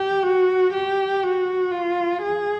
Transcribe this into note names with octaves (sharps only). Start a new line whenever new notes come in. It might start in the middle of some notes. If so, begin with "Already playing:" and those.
Already playing: G4
F#4
G4
F#4
F4
G#4